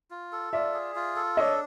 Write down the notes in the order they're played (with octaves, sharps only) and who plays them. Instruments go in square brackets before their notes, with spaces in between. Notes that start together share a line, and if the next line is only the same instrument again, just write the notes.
[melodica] F4
A4
[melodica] F4 [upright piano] D5 E5
[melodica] G#4
F4
A4
[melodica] D4 [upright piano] C#5 D#5